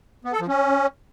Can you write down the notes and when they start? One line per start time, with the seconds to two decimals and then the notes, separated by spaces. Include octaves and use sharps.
0.25 B3
0.33 A4
0.40 F3
0.48 C#4